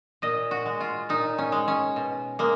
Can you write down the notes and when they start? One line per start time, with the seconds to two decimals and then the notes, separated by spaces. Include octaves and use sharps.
0.22 A#2 D#5
0.51 F#4
0.66 G#3
0.80 F4
1.09 A#2 D#4
1.38 C#4
1.52 G#3
1.68 C#4
1.96 B2
2.39 G#3 A#3